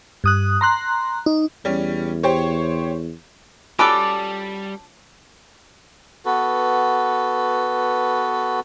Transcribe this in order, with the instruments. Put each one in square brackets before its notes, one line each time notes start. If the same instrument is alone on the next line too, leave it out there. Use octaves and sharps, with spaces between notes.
[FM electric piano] G2 D#6 F#6
A#5 C6 F#6
D#4
[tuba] E2 [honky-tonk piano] G3 C#4
[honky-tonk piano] G4 C5 C#5
[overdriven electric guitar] G3 [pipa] C#4 F#4 A4 [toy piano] F4 A5 [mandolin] D6
[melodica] B3 F#4 A4 B4